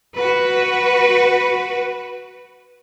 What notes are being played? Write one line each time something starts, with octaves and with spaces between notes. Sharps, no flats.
F#4 B4